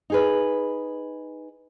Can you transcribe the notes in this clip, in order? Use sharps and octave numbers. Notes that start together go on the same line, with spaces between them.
D#4 G#4 B4